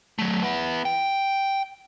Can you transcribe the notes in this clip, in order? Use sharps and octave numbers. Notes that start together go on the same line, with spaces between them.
F#3 A3
B3 E4
G5